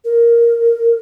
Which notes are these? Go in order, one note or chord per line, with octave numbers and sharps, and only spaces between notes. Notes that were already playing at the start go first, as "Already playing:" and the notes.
A#4